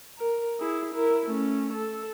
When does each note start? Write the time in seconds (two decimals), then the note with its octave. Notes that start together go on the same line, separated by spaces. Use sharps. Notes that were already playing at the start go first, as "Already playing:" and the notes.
0.19 A#4
0.60 E4 G#4
0.94 E4 A#4
1.27 A3 C#4
1.73 A4